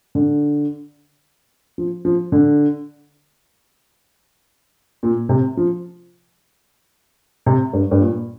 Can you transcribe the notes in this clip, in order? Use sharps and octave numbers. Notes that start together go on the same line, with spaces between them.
D3
F3
F3
D3
A#2
C3
F3
C3
G2
G2
A#2